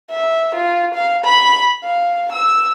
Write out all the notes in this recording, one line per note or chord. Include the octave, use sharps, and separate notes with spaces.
E5
F4
F5
B5
F5
E6